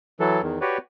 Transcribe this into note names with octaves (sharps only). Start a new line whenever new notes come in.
E3 F#3 A4
E2 D#3
F#4 G4 B4 C#5 D5